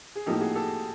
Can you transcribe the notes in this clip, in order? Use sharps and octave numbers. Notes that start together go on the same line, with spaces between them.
G#4
A2 F3 A#3 D#4 G4 A4
F#4 G#4
G4 A4